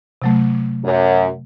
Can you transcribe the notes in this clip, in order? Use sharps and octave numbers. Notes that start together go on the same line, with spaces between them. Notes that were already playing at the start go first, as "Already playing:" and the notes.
C3 F#3 A3
F#2